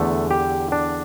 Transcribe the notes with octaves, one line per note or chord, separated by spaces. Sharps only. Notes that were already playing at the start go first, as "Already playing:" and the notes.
Already playing: E2 D3 A3
G4
D4